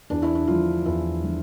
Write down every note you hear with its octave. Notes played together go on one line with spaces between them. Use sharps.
E2 D4
E4
D4
D3 F3 F4
E2 E4
D3 F3